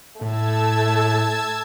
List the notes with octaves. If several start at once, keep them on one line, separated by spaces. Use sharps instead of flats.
A2 A3 A5 E6 G#6